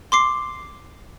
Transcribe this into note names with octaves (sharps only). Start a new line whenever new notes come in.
C6 D6 C7